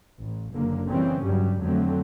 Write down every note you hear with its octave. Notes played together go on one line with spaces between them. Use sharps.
A1
F#1 D3 A#3
C#3 E3 G3 C4 C#4
G2 C#3 F#3 G3
F2 D3 F#3 A3 C4